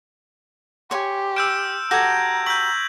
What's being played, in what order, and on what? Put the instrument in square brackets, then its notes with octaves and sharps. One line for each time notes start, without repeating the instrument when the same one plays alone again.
[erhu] G4 [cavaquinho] C#5 G#5 [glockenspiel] C6
[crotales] E6 G6 D7 [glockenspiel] F6 E7 G7
[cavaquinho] F#4 G4 A4 [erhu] A#5 [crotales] G6 G#6 [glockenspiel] A#6
[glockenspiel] C#6 E6 B6 [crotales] G6 F#7